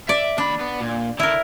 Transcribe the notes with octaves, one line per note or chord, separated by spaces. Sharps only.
D5 E5
D#2 D4 B5
B3
A#2
D3 E4 A#4